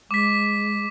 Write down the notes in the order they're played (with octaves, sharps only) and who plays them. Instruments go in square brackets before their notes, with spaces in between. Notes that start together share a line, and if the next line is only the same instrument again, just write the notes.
[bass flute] G#3 [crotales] D6 B6